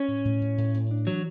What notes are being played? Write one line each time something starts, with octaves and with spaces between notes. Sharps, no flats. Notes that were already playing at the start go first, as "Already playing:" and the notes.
Already playing: C#4
A2
A2
A2
A2
A2
D4
E3 F#3